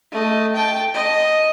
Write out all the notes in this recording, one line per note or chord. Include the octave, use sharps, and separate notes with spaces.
A3 D#5
G5 A5
D#5